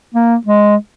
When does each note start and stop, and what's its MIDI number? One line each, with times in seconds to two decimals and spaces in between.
0.14 0.35 58
0.47 0.75 56